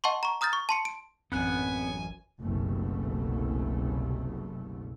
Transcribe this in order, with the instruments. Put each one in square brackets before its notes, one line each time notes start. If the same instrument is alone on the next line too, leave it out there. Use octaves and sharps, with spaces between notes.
[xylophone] D#5 F#5 A5 C6 C#6
A#5 C#6
A#5 D#6 F6 G6 A6
C#6
A5 C6 C#7
D7
[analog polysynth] A1 F#2 [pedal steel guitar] B3 F#6 [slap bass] C4 [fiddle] G#5
[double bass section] F#1 C2 F#2 B2 A3